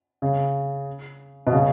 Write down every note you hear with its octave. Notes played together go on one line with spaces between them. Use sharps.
C#3
B2
C#3